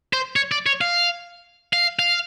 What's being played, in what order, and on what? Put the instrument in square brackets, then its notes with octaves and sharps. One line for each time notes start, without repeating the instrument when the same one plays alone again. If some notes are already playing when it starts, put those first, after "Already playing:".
[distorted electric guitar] C5
C#5
D5
C#5
F5
F5
F5